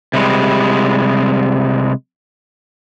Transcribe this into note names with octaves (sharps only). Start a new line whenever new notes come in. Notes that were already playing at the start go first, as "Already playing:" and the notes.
C3 G3 G#3